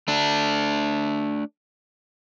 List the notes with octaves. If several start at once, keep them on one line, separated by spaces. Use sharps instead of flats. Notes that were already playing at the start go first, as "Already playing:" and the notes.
A3 D4